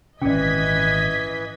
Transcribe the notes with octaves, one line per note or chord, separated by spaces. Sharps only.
G#1 A#2 E3 C#4 D5 D#5 G#6 B6